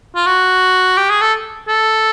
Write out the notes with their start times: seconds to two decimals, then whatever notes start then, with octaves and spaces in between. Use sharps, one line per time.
0.15 F4
0.26 F#4
0.97 G4
1.10 G#4
1.21 A4
1.68 A4